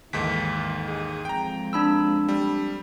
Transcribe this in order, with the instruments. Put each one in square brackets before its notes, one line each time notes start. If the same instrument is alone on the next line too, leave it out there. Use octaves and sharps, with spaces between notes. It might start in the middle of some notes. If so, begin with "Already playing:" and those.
[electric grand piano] D#2 G#2 D#3 [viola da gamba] E3 A4 [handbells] B6
[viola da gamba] G#4
[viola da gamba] F2 G#3 [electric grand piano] G5 A#5
[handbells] D4 B5 E6
[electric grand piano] G3